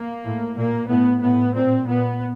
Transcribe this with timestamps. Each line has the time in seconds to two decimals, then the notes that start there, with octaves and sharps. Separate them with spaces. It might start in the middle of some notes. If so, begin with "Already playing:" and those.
Already playing: A#3
0.25 A2
0.57 A#2 A#3
0.89 A2 B3
1.22 A2 B3
1.55 A#2 C4
1.87 A#2 B3